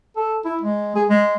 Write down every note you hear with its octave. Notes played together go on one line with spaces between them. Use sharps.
A4
E4
G#3
G#4
G#3